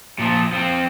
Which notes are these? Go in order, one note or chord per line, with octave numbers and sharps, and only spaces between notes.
A#2 F3
F3 C4